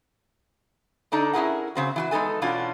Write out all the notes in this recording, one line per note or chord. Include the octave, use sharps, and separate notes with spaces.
D3 D4 D#4 A4 D#5
C#4 E4 F4 G#4 A#4 F#5
C#3 C4 F#4
E3 F4 F#4
G#3 B3 D#4 A4 G#5
B2 E3 C#4 D4 F4 F#4